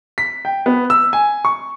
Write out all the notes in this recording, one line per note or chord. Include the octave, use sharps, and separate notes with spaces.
B6
G5
B3
E6
G#5
C#6